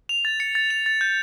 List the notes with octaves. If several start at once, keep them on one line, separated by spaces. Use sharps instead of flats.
F7
A6
C#7
A6
F7
A6
G6